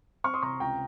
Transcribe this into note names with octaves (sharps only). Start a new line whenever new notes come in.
C4 C#6 F6
C6 D#6
C3 A#5 C#6
C#2 G5 A#5